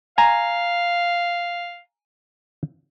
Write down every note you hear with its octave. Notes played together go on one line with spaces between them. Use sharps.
F5 G#5 A#5